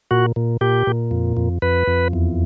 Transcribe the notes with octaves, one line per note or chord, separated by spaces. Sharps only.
A#2 F#4
A#2
A#2 G4
A#2
F2
F2
F2 B4
F2
E2